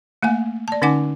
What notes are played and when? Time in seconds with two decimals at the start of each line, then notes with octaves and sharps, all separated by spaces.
0.22 A3 A#3 F#5 G#5
0.68 D5 A5
0.82 D3 C#4 D#4 F#5 G#5 D6